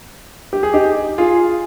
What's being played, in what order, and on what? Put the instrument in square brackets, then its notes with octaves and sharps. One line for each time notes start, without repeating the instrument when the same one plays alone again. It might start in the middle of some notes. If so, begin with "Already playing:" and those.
[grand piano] G4
G#4
D#4 G4
F4 G#4